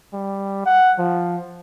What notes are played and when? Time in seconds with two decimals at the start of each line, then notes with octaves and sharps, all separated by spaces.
0.13 G3
0.66 F#5
0.99 F3